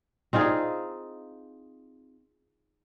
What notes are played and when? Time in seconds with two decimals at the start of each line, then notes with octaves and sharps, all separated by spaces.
0.33 C4 D#4 F4 G#4